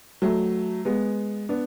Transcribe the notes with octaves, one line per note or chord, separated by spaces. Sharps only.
F#3 A3
G#3 B3
B3 D4